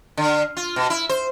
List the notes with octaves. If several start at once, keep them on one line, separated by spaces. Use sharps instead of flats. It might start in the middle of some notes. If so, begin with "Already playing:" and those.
D3
F4
B2
E4
C5